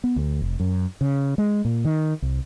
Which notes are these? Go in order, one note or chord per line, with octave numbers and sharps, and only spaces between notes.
B3
D2
F1
F#2
C#3
G#3
A#2
D#3
C2